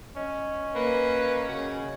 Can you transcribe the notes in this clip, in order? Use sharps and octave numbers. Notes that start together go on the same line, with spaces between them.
C#4 D#5
A#3 B4
C#3 F#4